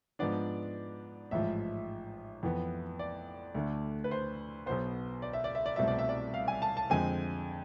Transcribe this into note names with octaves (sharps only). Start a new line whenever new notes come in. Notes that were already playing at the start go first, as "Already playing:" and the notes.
G#2 F3 B3 D4 D5
A1 G#2 F3 E5
F2 E3 B3
D5
D2 D3 A3 D4
B4
C5
B1 B2 B3 C5
D5
E5
D5
E5
D5
C2 B2 A3 C4 E5
D5
E5
D5
F5
G#5
A5
A5
F2 D3 G#3 C4 G#5